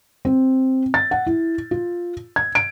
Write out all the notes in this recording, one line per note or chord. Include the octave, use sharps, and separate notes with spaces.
C4
A6
F#5
E4
F4
G#6
D7